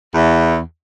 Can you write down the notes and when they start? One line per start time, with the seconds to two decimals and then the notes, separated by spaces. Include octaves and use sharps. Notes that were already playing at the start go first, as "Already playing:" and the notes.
0.14 E2